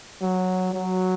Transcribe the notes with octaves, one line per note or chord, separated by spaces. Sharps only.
F#3
F#3